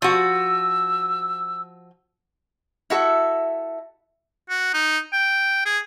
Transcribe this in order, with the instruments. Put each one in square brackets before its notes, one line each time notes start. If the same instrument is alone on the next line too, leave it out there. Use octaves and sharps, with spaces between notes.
[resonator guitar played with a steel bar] F3 F#4 [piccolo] E6
[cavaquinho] E4 F#4 A4 E5
[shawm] F#4
D#4
G5
G#4